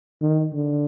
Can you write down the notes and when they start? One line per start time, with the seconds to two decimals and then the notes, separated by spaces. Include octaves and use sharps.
0.21 D#3
0.53 D3